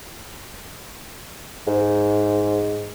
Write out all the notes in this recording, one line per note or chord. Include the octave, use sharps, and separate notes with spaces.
G#2